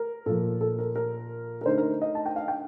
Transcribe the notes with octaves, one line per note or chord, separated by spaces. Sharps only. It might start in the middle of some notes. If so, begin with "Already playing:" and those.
Already playing: A#4
A#2 F3 A#3 A4
A4
A#4
A#4
A#4
D3 A3 D#4 C5
A#4
D#5
A5
G5
F5
G5